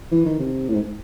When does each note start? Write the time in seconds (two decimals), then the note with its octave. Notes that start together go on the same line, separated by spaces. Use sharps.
0.12 E3
0.26 D#3
0.39 C3
0.68 A2
0.75 G#2